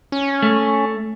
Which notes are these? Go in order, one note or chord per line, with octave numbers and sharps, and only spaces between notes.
C#4
A3